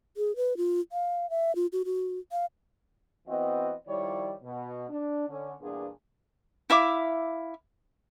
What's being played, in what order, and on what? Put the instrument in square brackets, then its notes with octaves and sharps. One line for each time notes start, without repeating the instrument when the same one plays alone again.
[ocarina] G#4
B4
F4
F5
E5
F4
F#4
F#4
F5
[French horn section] E3 B3 C4 F#4 D#5
D#3 F3 G3 E4 C#5 D5
B2
D4
D3 C#4
E2 G2 A#2 B3 D4 G#4
[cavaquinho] E4 E5 F5 D6